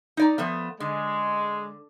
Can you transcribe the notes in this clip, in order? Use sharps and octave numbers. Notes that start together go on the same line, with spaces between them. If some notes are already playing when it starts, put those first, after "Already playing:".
D#4 D5 A#5
F3 A3 B3
D3 G#3